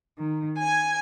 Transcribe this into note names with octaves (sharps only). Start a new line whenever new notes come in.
D#3
G#5 G#6